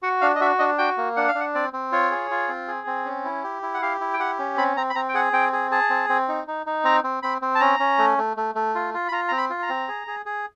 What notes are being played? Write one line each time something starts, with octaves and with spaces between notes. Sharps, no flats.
F#4 F#5
D4 F5
D#5
F#4 E5
D4 D#5
F#4 G5
A#3
D4 F#5
F5
D4
F#5
C4 D5
C4
F4 C#5
G#4
F4
C4
G#4
C4
C#4
E4
G4
E4
F#5
G4 F5
E4
G5
G4 F#5
C#4
C4 B5
C4 A#5
B5
C4 A#5
G5
G#4 F#5
C4 G5
G#4
G#4 A5
C4
C4
D#4
D#4
D#4
C4 A#5
C4
C4 B5
C4
A5
C#4 A#5
C#4
A3
A3
A3
A3
F4
F4
B5
F4 A#5
C4 A#5
B5
F4
A#5
C4
G#4
G#4
G#4